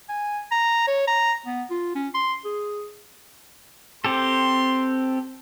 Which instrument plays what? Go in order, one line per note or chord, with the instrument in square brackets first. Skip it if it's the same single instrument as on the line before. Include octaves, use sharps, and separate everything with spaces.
[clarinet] G#5
A#5
C#5
A#5
B3
F4
C#4
C6
G#4
[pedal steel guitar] C4 G4 A4 [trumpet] C6